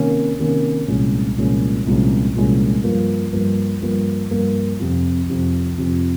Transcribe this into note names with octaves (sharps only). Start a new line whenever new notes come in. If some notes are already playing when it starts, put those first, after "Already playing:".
Already playing: C3 D#3 A#3 C#4
C3 D#3 A#3 C#4
C2 A#2 F3 G#3 C#4
C2 A#2 F3 G#3 C#4
C2 A#2 F3 G#3 C#4
C2 A#2 F3 G#3 C#4
G2 F3 A#3
G2 F3 A#3
G2 F3 A#3
G2 F3 A#3
F2 C3 F3
F2 C3 F3
F2 C3 F3